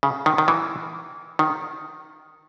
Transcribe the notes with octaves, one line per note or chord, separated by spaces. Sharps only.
C#3
D#3
D#3
E3
D#3